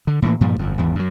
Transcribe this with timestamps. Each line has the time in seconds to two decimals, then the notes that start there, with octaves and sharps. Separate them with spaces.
0.07 D3
0.22 A2 E3 A#3
0.41 G2 A#2 F3 G3
0.59 G1 F2
0.78 G#1 E2
0.95 F#2 F#3